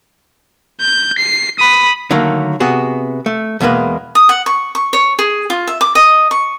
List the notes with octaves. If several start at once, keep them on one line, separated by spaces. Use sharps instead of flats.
G6
C7
B5 D#6
D3 D#3 F#3 A3 A#3
C3 B3 F#4 G#4
A3
E2 B2 G#3 A#3 B4
D#6
F#5
C#6
C#6
C#5
G#4
F4
E5
D6
D#5
C#6